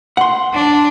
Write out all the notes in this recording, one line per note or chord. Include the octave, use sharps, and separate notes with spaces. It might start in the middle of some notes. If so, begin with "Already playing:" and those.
F#5 C6
D4